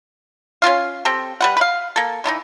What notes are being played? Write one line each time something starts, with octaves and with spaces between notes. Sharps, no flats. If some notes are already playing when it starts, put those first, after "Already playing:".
C#4 D4 F4 F5
C4 G4 A4
G3 B4 F#5
B4 F5
A#3 A4
D3 E3 D4 D#4